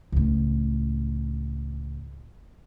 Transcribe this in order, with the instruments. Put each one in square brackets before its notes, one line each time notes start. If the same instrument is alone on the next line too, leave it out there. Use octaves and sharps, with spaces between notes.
[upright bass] C#2 A2